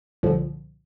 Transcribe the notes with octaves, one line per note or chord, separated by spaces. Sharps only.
C2 A#2 D3 F3